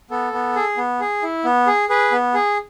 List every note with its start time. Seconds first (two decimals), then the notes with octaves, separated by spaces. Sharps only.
0.11 B3 A4
0.33 B3
0.56 G#4
0.77 B3
1.00 G#4
1.23 E4
1.45 B3
1.67 G#4
1.89 G#4 B4
2.12 B3
2.34 G#4